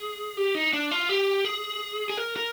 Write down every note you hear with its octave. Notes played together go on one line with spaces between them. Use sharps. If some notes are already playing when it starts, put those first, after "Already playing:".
Already playing: G#4
G4
D#4
D4
F4
G4
G#4
G#4
A#4
A#4